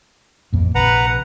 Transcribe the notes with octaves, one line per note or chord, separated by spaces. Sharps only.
A1 F2 A#3
A#1 C3 B4 F#5 A#5